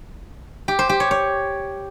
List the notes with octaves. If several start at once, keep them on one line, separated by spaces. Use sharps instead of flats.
G4
C5
G4
C#5
C#5